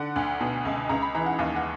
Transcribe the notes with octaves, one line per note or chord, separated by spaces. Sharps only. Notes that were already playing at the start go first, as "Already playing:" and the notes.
Already playing: D3 F#5
D2
B2
C#2
C#2 A#5
B5
E3 A#5
F#5
D#2 F5
F#5